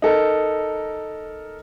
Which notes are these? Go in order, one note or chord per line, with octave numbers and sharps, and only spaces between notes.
D#4 A4 A#4